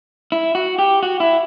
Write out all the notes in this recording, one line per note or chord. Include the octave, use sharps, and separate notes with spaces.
E4
F#4
G4
F#4
E4